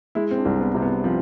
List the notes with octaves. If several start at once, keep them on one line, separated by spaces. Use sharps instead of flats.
G#3 E4
C4
D4
C2
B3
C3 C4
B3
F3 C4